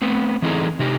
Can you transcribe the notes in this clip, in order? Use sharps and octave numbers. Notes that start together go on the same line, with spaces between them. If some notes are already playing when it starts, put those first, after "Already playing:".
A3 B3 C4
E3 C4 D#4 E4 G#4 A4
C3 D#4 G4